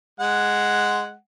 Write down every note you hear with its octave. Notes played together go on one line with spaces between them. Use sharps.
G#3 F#5